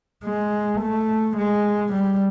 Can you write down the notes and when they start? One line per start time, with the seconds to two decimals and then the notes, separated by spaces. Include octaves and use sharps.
0.24 G#3
0.81 A3
1.37 G#3
1.94 G3